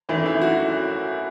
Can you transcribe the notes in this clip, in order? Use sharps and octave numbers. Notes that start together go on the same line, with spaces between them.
G#1 F#2 E3 A3 D#4
E4
F#4